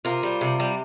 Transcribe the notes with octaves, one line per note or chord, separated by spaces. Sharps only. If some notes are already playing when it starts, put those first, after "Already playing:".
C3 F4 A#4
G3
C3
G3